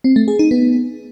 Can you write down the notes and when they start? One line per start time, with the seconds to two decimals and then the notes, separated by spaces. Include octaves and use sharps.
0.04 C4
0.16 A3
0.28 G#4
0.39 D#4
0.51 B3